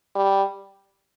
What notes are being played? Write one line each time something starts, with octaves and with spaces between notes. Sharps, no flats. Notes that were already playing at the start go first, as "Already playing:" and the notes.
G3